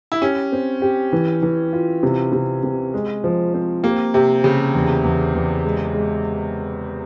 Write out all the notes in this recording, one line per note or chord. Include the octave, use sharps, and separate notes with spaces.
E4
C#4 G4
C4
G4
E3
E3
F4
C3
C3
C3
G#3
F3
C4
A#3 G4
C3 G4
C#3 G4
E2
E2
E2
G#3
G#3